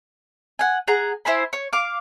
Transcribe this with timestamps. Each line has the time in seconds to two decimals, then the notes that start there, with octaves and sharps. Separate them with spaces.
0.59 F#5 G#5
0.88 G#4 F#5 A#5
1.25 E4 C5 G#5 B5
1.53 C#5
1.73 F5 D6